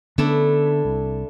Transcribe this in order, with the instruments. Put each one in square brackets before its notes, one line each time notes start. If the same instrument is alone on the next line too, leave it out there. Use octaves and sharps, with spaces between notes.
[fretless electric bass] D3 B3 C#4 [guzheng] A3 D4 E4
[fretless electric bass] C2